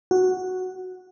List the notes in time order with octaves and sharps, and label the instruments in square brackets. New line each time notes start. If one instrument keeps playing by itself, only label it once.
[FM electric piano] F#4